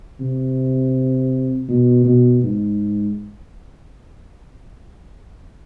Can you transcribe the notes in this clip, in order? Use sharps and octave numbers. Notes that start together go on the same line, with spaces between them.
C3
B2
B2
G#2